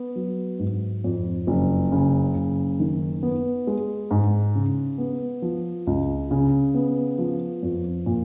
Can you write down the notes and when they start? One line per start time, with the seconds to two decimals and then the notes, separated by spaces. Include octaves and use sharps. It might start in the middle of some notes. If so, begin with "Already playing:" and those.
Already playing: B3
0.16 F#3
0.59 G#2
1.04 F2
1.47 F#1
1.92 C#3
2.35 F#1
2.80 D#3
3.23 B3
3.67 G#3
4.11 G#2
4.55 C#3
4.98 B3
5.42 F3
5.87 C#2
6.31 C#3
6.75 B3
7.19 F3
7.63 F2
8.06 A#2